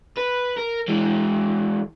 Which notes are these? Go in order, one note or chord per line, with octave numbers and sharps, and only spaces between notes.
B4
A#4
E3 G#3